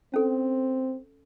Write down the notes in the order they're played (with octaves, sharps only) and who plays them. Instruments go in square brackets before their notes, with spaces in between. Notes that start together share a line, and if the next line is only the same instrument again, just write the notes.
[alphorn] C4 [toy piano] C#4 A4